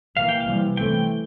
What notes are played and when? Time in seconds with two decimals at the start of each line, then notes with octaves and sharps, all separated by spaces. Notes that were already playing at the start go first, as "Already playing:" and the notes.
0.17 C3 E3 A#3 F5
0.29 G5
0.40 F5
0.46 C3 E3 G3
0.77 E3 A3 C4 G5